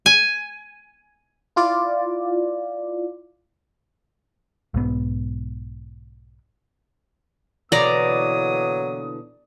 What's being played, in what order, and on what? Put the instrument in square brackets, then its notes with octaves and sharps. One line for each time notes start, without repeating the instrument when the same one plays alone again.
[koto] G#5
[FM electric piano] E4 F4 D5
[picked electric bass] B1 G#2 B3
[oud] B2 D3 E3 [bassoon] F#3 [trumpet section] A#3 D#6 [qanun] D5 A#5